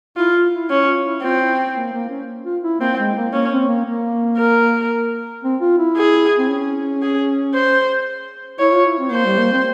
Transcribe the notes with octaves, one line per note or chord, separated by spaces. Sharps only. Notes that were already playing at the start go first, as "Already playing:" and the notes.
E4 F4
F4
E4
C#4 E4
F4
E4
C4 F4
E4
A#3
A#3
C#4
F4
E4
A#3 C4
G#3
A#3
A#3 C#4
C4
A#3
A#3
A#4
C4
F4
E4
G#4
C4
C#4
G#4
C5
E4 C#5
F4
E4
C4
A#3 C5
G3
A#3
C4